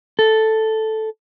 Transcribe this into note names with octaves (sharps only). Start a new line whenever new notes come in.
A4